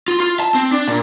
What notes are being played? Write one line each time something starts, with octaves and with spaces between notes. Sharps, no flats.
F4
F4
A5
C4
D4
A#2